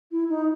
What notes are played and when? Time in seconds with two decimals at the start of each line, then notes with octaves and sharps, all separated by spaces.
0.11 E4
0.29 D#4